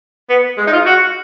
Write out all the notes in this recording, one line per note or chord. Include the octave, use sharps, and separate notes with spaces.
B3
G#3
D#4
F4
F#4